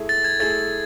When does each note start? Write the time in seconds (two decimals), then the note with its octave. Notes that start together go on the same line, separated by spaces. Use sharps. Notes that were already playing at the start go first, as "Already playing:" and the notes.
Already playing: A3 E4 G#4
0.09 A6
0.24 G#6
0.39 A3 E4 G#4 A6